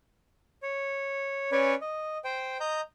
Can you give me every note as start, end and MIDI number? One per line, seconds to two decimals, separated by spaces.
0.62 1.51 73
1.52 1.75 61
1.52 1.75 71
1.52 1.75 73
1.52 1.75 74
1.52 1.75 80
1.81 2.18 75
2.24 2.57 72
2.24 2.57 79
2.60 2.81 75
2.60 2.81 82
2.60 2.81 91